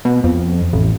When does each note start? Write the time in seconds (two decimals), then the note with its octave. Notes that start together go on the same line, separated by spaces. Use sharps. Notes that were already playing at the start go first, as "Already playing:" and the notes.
0.05 B2
0.24 F2
0.73 A1